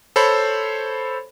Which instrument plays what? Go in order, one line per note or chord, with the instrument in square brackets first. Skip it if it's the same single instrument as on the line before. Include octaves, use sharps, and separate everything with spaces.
[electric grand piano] A4 C5 C#5 B5